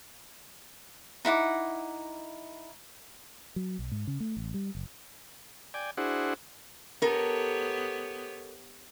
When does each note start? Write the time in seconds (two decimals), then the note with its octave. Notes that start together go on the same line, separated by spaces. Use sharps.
1.25 D#4 E4 F#5 D6
3.56 F#3
3.79 B1
3.92 G#2
4.07 C#3
4.20 A3
4.37 A1
4.54 G3
4.75 F#1
5.74 D5 G5 G#5
5.97 D4 E4 F#4 G#4 C5 F#5
7.02 B3 G4 A4 A#4 C#5